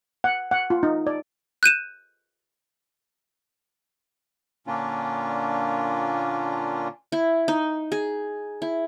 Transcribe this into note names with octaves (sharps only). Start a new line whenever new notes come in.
F#5
F#5
F4
D#4
D5
F#6 G6 D#7 E7
A#2 D3 A#3 C#4 D4 F4
E4
D#4
G#4
E4